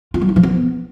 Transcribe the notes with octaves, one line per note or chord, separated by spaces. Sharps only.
F4
G3
D#4
F3
B3